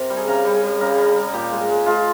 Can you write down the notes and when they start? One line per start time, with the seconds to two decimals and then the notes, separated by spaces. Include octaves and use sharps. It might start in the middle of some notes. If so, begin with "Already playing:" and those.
Already playing: C3 A#4
0.10 G3
0.16 G#4
0.28 C#3 A#4
0.45 G3
0.54 G#4
0.63 G3
0.81 C#3 A#4
0.98 G3
1.07 G#4
1.16 G3
1.33 A#2 G4
1.51 G#3
1.69 G#3
1.86 G#3 F4